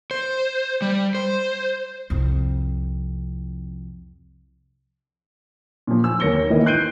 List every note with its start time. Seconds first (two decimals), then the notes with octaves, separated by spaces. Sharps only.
0.11 C5
0.82 G3
1.15 C5
2.10 C2 F2
5.87 A#2 F3
6.04 G#5 E6
6.20 D#2 A#3 C#5 A#6 C#7 G7
6.50 D#3 E3 A#3 D#5
6.66 F#6 G6 C7 D7 D#7 G7